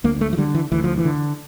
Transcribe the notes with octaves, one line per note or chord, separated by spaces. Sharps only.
D2 A#3
A3
F3
D3 G3
E3
D2 E3
F3
E3
D3